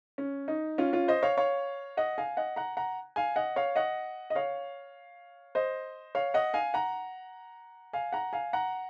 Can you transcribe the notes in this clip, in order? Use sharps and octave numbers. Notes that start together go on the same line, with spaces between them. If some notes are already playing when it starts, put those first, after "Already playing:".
C#4
D#4
C#4 F4
C#4 F4
C5 D#5
C#5 F5
C#5 F5
D#5 F#5
F5 G#5
D#5 F#5
F#5 A#5
F#5 A#5
F5 G#5
D#5 F#5
C#5 F5
D#5 F#5
D#5
C#5 F5
C5 D#5
C#5 F5
D#5 F#5
F5 G#5
F#5 A#5
F5 G#5
F#5 A#5
F5 G#5
F#5 A#5